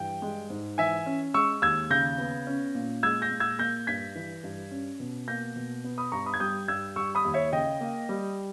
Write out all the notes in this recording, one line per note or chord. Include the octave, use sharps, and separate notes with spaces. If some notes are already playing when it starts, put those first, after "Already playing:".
Already playing: G2 E3 G5
G#3
G#2
E3 E5 G#5
C#4
G#3 C#6 E6
D#2 E6 G#6
C#3 G6 A#6
B3
C#4
A#2
G#3 E6 G#6
G6 A#6
A#2
E6 G#6
A#3 G6 A#6
G2 G#6 B6
E3
G2
C#4
B2
A#3 G6 A#6
B2
B3
B5 D#6
G2 A#5 C#6
B5 D#6
G#6
G3 D#6 G6
G2 E6 G#6
G3 C#6 E6
B5 D#6
D#2
C#5 E5
C#3 D#5 G5
A#3
G3